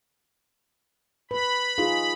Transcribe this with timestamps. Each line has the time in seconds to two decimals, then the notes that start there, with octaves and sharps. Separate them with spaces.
1.31 B4 B5
1.78 D#4 F4 G#4